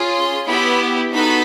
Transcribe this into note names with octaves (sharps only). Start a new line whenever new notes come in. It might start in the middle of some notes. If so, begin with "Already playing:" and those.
Already playing: C#4 F4 G#4
C6
B3 E4 G4 B5
B3 D#4 F#4 A4 B5